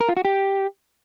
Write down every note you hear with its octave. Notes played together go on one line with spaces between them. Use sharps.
A#4
F4
F#4
G4